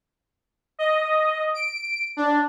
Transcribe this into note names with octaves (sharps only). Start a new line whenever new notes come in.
D#5
D7
D4